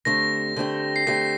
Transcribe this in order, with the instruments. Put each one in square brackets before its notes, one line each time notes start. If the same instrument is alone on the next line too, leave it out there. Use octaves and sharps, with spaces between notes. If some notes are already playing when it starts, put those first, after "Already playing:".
[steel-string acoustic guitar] D3 A3 C4 G4 [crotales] A#6
[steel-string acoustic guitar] D3 A3 C4 G4
[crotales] C7
[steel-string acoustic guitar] D3 A3 C4 G4 [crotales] A#6